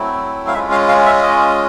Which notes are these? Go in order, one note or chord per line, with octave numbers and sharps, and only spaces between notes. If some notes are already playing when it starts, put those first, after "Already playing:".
Already playing: F#3 A3 C4 E4
F5
G#3 C#4 F4 E5
F5
F5
E5
D#5